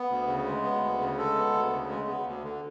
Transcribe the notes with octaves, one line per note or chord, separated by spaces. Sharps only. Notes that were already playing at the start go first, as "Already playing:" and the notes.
Already playing: B3
D2
C#3
G#3
B3
D2
C#3
G#3 A4
B3
D2
C#3
G#3
B3
D2
D3